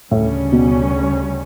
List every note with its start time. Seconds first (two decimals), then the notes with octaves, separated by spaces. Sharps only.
0.11 D2 A2 C#3 G3 C#4
0.52 B2